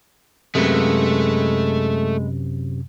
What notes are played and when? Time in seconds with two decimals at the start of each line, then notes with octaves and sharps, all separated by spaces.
0.55 F#2 C3 G#3 A3 B4